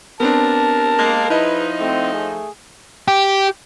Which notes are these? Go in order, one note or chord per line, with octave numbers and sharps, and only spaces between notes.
B3 C4 D4 A#4 A5
G#3 A#3
F3 D#4 E4 B4 D#5
A3 C4
G#4
G4